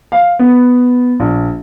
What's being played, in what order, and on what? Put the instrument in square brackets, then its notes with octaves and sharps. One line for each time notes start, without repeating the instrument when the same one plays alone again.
[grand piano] F5
B3
A#1